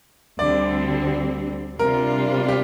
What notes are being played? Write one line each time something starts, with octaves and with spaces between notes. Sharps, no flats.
D2 D3 G3 C4 D5
C3 G3 D4 F4 A#4
G4